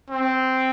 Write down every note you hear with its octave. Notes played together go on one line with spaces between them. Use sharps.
C4